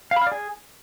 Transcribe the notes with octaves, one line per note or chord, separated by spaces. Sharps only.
F5
B5
F5
D5
G#4